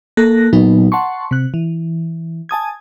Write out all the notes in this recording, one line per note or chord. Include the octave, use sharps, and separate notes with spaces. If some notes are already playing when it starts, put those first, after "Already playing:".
A#3 A4 F#6 A#6
A#2 F#3 B3 D#4
F#5 A5 C6 C#6
C3 F#6
E3
G#5 A5 D#6 G#6